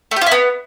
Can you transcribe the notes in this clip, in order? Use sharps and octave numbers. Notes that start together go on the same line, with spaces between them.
A3
G4
F4
E4
B3